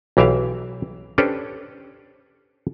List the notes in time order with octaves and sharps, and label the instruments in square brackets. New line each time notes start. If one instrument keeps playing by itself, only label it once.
[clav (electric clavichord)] B1 E3 G4 E5 F5
C#4 D4 G4 A4 B4 C5